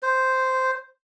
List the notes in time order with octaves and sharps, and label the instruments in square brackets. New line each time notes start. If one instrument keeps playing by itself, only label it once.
[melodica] C5